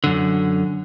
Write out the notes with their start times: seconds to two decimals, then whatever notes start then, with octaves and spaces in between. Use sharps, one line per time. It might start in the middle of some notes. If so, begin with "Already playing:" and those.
0.04 F#2 D3